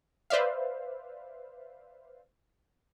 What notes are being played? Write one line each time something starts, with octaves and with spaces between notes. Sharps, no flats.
B4 C5 D5 E5 F5